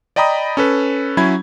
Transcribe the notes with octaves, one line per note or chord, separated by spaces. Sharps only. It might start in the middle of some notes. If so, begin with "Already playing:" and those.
D5 D#5 G5 A#5 B5 D#6
C#4 A4 B4
F#3 C#4 E4 B5 G#6